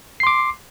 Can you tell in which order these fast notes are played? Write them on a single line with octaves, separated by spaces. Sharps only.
C7 C6 D6